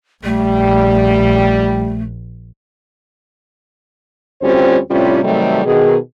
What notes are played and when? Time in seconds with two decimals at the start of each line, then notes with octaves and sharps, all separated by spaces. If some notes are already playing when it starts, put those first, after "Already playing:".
0.24 A#1 G3 A3
4.42 D2 G3 C4 C#4 F4 C5
4.90 A2 C3 G3 C4 C#4 F4
5.23 C3 D#3 F#3 G3 A3
5.65 B2 D#3 G#4